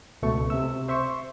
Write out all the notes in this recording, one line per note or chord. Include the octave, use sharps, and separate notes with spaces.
C#2 B2 A3 C#6
C3 E5 E6
C5 E5 C6 C#6